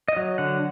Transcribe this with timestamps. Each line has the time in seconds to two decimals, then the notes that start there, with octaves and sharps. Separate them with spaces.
0.08 D#5
0.16 F#3
0.38 D3 F#5